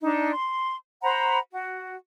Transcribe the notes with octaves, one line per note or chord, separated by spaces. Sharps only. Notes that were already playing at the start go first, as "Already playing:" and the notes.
D4 D#4 A5
C6
C5 F#5 A#5 B5
F#4